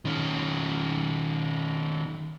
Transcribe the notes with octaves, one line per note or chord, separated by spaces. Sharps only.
D#3 C#4